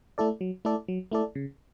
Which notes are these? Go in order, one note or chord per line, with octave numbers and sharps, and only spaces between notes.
A3 E4 A4 D5
F#3
A3 E4 A4 D5
F#3
A3 E4 A4 D5
C#3